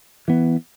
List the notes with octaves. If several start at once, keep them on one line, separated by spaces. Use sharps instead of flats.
E3 B3